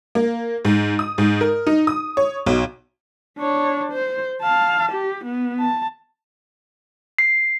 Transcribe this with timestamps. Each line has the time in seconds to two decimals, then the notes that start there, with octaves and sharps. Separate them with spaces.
0.15 A#3
0.65 G#2
0.99 D#6
1.18 G#2
1.41 A#4
1.67 D#4
1.87 D#6
2.17 C#5
2.46 B1
3.38 D4 C#5
3.92 C5
4.42 F5 A5
4.92 G4
5.25 B3
5.60 A5
7.19 C7